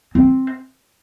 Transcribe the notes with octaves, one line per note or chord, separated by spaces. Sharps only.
C4